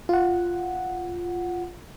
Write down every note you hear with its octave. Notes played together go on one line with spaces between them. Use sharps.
F4 F#5